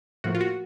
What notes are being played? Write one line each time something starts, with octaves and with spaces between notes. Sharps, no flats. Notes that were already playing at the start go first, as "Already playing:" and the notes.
A2 F3 A#3 F#4
F4
F#4